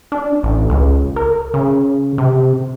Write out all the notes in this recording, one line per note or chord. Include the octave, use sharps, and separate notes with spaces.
D4
A1
C#2
A#4
C#3
C3